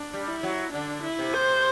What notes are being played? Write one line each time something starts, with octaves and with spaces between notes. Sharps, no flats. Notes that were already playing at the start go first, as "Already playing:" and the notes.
Already playing: D4
G3
E4
F#3
D3 D4
E4
C3
C5